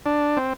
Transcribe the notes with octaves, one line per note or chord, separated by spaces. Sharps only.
D4
C4